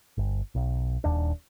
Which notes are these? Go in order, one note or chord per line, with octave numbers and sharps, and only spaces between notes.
G1
B1
D#1 D#2 D4